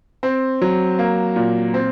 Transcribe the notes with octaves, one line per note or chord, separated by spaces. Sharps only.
C4
F#3
A#3
A#2
C4